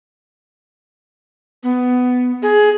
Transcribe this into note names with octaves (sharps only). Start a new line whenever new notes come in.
B3
G#4